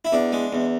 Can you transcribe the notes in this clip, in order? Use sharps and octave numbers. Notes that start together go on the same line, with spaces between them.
E4
E2 D4
G#3
E2